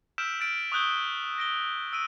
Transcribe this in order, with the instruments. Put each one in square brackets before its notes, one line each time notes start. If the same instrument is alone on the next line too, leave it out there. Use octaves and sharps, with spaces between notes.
[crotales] E6 F6 G6 B6 D7 E7
F6 A6 D7
C#6 D#6 E6 F#6 G6 G7
A#6 D7 G7
E6 D7 D#7